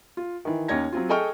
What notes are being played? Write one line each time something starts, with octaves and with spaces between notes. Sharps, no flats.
F4
D#3 E3
D#2 C#4 D#4 C#5 G#6 A#6
F#3 C4 F4
G#4 A4 D#5 G5 C#6 F6